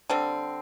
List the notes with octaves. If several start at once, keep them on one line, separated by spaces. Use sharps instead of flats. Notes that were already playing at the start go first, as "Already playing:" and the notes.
D3 G3 C4